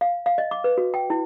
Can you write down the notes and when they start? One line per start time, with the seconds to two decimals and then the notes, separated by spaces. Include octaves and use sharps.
0.01 F5
0.26 F5
0.38 D#5
0.51 D6
0.64 B4
0.78 F#4
0.94 G5
1.10 E4